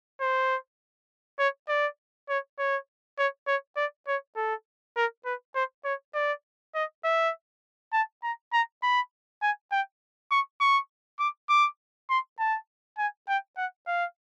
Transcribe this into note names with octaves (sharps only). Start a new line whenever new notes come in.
C5
C#5
D5
C#5
C#5
C#5
C#5
D5
C#5
A4
A#4
B4
C5
C#5
D5
D#5
E5
A5
A#5
A#5
B5
G#5
G5
C#6
C#6
D6
D6
C6
A5
G#5
G5
F#5
F5